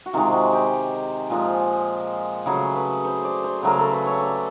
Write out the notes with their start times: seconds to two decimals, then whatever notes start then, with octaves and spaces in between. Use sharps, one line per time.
0.06 F#4
0.13 C3 D#3 G#3 F4
0.32 F#4
0.53 G4
1.30 A#2 F3 G#3
2.46 C#3 F#3 A3 G#4
2.75 B4
3.05 C5
3.24 D5
3.44 C5
3.63 C#3 F#3 A3 A#4
3.77 A4
3.91 B4
4.06 C#5
4.20 D5